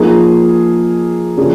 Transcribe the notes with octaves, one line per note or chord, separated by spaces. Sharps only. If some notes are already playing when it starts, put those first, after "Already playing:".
Already playing: F3 A#3 D#4 G#4
C#3 F3 A#3 D4 G#4